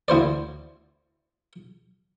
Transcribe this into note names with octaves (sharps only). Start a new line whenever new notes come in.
D2 E4 C5 D5